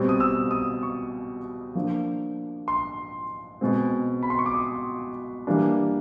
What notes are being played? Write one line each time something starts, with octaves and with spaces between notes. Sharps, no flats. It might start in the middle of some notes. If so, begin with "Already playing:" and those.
Already playing: B2 G3 C4
D#6
E6
D#6
C#6
F3 A#3 D4
C6
B2 G#3 C4
B5
C6
C#6
D6
D#6
E3 G3 A#3 D4